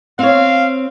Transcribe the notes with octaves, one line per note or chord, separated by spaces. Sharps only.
C4 C#5 F5